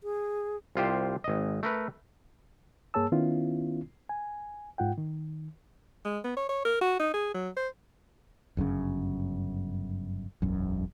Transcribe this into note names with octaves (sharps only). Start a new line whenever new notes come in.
G#4
C2 F4 G4 C5
G#1 D#5
A3 A#4 B4
G2 A#3 G#4 C#5 A5 E6
D#3 B3 C#4 E4 F4
G#5
G#2 F4 F#5 G5
D#3
G#3
B3
C#5
C#5
A#4
F#4
D#4
G#4
F#3
C5
G1 F#2 A2 C#3
E1 B1 F#2